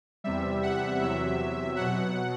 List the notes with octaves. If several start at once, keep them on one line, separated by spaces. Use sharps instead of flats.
E2 C3 G3 E5
F#5
E2 C3 F#3 E5
B2 F#3 F#5